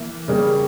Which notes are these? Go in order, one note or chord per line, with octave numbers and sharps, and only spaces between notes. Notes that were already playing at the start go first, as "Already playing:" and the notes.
Already playing: E3 A#3 E4
C#3 G3 A#3 C#4